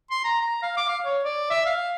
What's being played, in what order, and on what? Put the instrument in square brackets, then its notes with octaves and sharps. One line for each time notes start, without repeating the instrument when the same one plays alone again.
[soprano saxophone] C6
A#5
A#5
F5
D6
F5
C#5
D5
E5
F5